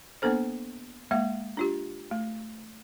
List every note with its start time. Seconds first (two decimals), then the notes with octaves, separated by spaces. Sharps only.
0.22 A#3 B3 D4 A4 C5
1.11 G#3 A#3 F5
1.57 D4 F4 G4
2.11 A3